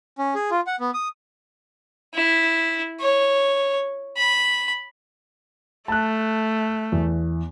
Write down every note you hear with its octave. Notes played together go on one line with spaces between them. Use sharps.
C#4
G#4
F4
F#5
B3
D#6
E4
C#5
B5
A3 A5 F#6
E2